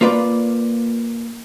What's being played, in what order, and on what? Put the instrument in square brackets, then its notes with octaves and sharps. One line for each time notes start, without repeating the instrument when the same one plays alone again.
[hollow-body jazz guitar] A#3 F4 B4 D5